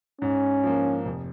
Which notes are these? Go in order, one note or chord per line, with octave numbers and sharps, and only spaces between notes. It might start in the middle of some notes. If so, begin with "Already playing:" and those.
G#2 C#4
F3 A#3
F1